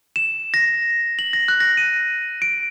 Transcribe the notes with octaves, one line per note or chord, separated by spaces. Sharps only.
E7
A#6
F#7
A#6
F#6
A#6
D#7
D7